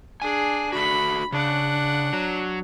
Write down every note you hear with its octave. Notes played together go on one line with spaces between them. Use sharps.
D4 G#4 G#5
A3 F#4 B5
C#3 D4 F#5
F#3